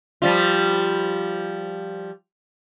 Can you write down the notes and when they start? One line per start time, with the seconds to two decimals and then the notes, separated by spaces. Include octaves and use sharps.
0.22 F3 G3 F4